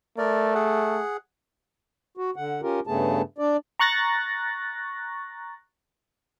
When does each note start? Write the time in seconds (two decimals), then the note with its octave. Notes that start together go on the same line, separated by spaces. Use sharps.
0.18 A3 A#4 D5
0.55 G#4 F#5
2.17 F#4
2.36 D3 F#5
2.62 C#4 F4 G4 A#4
2.87 G2 C#3 A3 B3 G#4 A5
3.38 D4 D5
3.79 A#5 C#6 F#6 A6 A#6